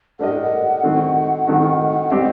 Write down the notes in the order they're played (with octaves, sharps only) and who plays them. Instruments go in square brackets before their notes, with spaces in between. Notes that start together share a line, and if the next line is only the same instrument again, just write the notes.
[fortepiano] A3 D4 G4 A#4 D#5 [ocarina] F#5
[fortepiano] D#3 A3 C4 D#4 F#4
D#3 A3 C4 D#4 F#4
[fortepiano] G3 C4 G4 [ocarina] D#5